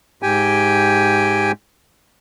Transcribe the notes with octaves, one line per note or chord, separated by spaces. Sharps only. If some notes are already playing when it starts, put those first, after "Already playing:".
G#2 G4 G5 G#5